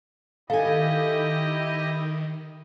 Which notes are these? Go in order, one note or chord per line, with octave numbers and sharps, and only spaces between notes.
D#3 E4 G4 A4 D#5 F5 G#5